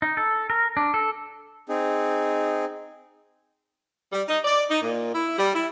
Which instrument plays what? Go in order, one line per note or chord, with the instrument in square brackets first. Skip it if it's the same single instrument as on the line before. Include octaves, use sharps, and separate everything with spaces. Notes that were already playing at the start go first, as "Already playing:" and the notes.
[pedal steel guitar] D#4
A4
A#4
D4
A4
[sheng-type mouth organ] C4 D#4 G#4
[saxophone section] G3
D#4
D5
D#4
A#2
E4
G3
E4